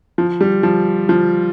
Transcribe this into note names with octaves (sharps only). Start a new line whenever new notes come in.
F3
G3
F3
F3